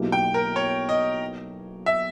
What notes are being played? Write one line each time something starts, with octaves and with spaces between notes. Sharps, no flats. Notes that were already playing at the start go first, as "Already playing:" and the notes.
Already playing: B1 B2 A#3 E4 G4
G5
A#4
C#5
D#5
E5